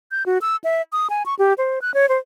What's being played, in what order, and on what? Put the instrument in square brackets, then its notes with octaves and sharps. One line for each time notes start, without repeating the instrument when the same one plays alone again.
[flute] G6
F#4
E6
E5
D#6
G#5
C#6
G4
C5
F#6
C#5
C5